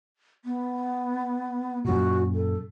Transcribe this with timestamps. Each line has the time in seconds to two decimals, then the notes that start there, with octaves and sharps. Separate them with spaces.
0.45 B3
1.85 F#2 A#2 F#4
2.34 A4